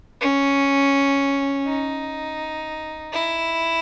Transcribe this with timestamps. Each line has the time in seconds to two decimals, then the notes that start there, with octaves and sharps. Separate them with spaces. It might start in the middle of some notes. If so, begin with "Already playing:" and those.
0.20 C#4
1.67 D#4
3.13 E4